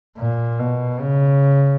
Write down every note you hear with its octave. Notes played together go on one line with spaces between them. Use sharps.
A#2
B2
C#3